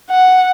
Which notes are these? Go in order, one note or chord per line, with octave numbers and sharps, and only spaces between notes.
F#5